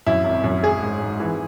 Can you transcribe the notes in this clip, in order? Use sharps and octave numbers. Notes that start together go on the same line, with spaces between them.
F#2 E4
G#1
F#2
G#3 G#4
G#2
G#2
E3